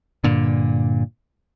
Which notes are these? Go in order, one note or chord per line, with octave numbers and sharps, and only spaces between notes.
G2 A#2 D3